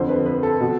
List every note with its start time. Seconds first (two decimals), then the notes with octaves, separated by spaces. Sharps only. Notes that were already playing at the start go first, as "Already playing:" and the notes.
Already playing: F2 D3 F3 C5
0.09 B4
0.26 B4
0.43 A4
0.61 B2